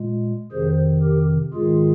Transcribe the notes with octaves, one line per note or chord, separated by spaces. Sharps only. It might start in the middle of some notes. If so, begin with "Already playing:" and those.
Already playing: A#2 G#3
F2 C3 D#3 G#4 C5
G4 A#4
G#2 D#3 G#3 F4 G#4